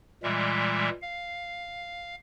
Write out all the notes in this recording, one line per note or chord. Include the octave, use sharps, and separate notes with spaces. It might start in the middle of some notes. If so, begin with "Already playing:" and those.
A#2 E3 G3 G#3 E5
F5